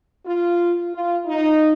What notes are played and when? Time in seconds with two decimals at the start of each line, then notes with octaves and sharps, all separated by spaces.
0.25 F4
0.92 F4
1.26 D#4